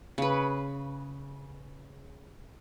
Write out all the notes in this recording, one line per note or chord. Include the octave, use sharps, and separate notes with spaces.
C#3 B4